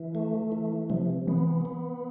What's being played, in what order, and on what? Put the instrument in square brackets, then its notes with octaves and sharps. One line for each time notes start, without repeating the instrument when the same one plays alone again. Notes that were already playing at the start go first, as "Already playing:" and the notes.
Already playing: [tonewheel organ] E3
A3
E3
[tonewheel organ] C3 [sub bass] F3
[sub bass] E3 [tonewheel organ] B3
[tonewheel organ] B3